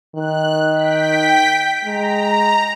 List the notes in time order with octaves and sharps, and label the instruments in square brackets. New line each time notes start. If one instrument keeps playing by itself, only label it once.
[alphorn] D#3 [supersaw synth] F#6
[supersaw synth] G5 B6
[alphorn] G#3 [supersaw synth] A#5